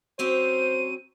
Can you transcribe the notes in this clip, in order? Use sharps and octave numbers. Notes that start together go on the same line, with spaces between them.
F#3 C4 C#4 C5 D#7